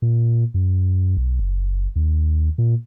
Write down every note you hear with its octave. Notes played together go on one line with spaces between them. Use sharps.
A#2
F#2
B1
F#1
D#2
A#2